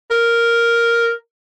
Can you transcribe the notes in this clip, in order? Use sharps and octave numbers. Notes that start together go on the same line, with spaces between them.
A#4